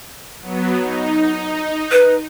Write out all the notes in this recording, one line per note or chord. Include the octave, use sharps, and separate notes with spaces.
F#3 B3
D#4
B4